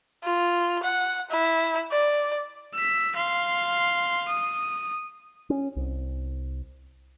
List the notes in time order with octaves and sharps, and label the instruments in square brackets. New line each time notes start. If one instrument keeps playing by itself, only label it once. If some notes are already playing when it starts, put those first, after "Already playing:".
[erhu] F4
F#5
E4
D5
[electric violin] E6 B6
F5 C6
D#6
[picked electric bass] C#4
C2